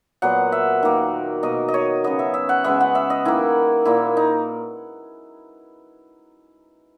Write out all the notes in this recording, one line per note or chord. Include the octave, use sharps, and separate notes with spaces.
A#2 F#3 B3 F#5
E5
D#3 A#3
B2 A#3 D#5
D#5
C#5
C#3 F#3 B3 D#5
E5
E5
F#5
C#3 G#3 B3 E5
F#5
E5
D#5
D#3 A#3 E4
A#2 A#3 E4
D#4